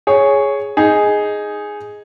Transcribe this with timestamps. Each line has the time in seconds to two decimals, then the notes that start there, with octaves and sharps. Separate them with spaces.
0.07 G#4 C#5
0.77 D#4 G#4